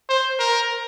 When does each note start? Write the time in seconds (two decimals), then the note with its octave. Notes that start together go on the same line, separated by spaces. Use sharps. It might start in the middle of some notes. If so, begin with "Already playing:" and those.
0.09 C5
0.39 A#4